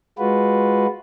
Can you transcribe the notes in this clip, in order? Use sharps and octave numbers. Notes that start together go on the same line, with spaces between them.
G#3 F4 F#4 B4